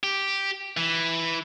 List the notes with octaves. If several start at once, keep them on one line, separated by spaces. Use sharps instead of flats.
G4
E3